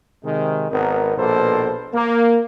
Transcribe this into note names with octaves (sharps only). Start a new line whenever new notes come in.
C3 D#3 G#3
G#1 B3 D#4 A#4
A#1 B2 A#3 A4 B4 C5
A#3